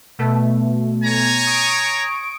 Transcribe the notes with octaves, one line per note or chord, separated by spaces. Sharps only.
B2 A3
C#5 G#5 A#5
C#6 D#6 D7